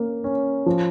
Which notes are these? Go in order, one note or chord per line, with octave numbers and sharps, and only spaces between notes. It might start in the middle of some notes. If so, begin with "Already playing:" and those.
Already playing: A#3 C#4
C#4
F3